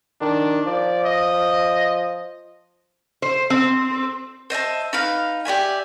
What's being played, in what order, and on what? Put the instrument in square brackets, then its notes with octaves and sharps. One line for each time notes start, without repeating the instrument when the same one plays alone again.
[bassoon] D#3 [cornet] D4
[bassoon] F3 [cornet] D5
[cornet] D#5
[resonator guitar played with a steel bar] C5
C4
[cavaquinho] C5 D#5 E5 A5
D#4 B4 F5
G4 D5 E5 G#5